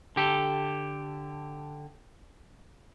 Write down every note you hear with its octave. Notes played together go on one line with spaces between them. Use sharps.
D3 G4 A4